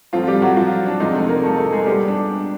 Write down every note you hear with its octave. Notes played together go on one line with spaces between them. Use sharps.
A2 F3 F#3 A3 C4 F4
G3 G4
F#3 F#4
F3 F4
D4
F2 C3 F3 G#3 C4 D#4
A3 A4
A#3 A#4
A3 A4
A3 A4
G#3 G#4
A#2 G3 B3 G4
D4